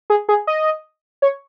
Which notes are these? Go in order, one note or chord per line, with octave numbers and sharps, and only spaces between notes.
G#4
G#4
D#5
C#5